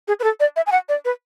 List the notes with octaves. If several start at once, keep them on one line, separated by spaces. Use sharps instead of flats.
G#4
B4
A4
D5
E5
G#5
F#5
D5
B4